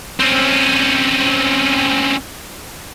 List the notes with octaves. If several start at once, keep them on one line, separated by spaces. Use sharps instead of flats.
C4 C#4